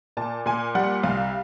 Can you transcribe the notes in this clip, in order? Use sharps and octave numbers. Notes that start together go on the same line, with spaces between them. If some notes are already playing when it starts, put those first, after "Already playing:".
A#2 A5
A#2 G#5
G3 F#5
C2 F5